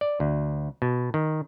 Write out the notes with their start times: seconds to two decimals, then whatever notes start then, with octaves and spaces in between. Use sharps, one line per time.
0.01 D5
0.20 D2
0.82 B2
1.14 D#3